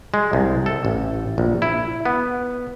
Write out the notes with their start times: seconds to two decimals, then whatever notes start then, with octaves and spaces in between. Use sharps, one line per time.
0.14 G#3
0.33 C2
0.66 A4
0.85 A1
1.38 A#1
1.62 E4
2.05 B3